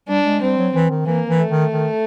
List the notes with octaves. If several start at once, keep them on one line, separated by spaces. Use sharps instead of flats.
G3 D4
G#3
G3 C4
F#3
E3
D#3
E3 A#3
E3
A3
D#3
D#3